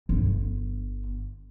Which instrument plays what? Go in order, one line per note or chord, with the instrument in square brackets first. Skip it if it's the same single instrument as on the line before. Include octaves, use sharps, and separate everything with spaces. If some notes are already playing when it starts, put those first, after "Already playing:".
[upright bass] G1